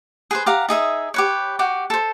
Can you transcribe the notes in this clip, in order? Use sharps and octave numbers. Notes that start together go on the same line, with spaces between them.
G#4 B4 C5
G4 F5 F#5 A#5
D#4 G#4 E5 D#6
G4 B4 C#5
F#4 G4 G5
A4 C5